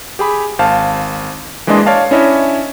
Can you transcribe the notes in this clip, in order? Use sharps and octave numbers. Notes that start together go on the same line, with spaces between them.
G4 G#4 B5
G#1 C5 F5 A5
E3 G#3 A#3 D4 D#5 C6
C#5 D5 F5 A5
C#4 D4 E4 C#5 D#5 E5